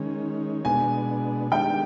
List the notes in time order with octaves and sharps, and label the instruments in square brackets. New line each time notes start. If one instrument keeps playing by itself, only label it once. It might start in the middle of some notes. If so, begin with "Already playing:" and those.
Already playing: [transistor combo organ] D#3 G#3 C#4
[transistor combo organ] B2 G#3 B3 D4 [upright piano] G#5
[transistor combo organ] D#3 G#3 B3 D4 G4 [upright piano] G5